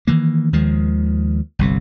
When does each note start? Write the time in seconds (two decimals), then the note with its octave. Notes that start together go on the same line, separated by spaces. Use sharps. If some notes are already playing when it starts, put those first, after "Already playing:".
0.07 D#3 E3 A#3
0.53 D#2 D#3 F3 G#3
1.59 G1 C2 C3